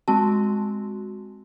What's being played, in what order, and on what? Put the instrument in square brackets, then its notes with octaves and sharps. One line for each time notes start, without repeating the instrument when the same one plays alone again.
[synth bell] G#3 C4 F#4 [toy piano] A5